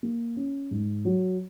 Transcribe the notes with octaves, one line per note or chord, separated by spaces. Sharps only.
A#3
C#4
G#2
F#3